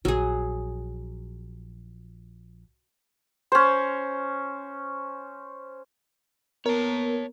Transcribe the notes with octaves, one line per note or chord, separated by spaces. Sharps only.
A#1 F#3 G#4
C#4 C5
B3 A#4 C#5 A5